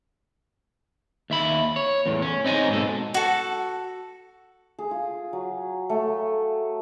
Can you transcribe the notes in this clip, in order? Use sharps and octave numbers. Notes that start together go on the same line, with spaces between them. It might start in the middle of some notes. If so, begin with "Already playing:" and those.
D#2 E5 B5
C#5
E2 A2
C#4
C4 D#4 B4 D#5 G#5
G#2 B2 A4
F#4 A4
G#4
F4
F#3
A3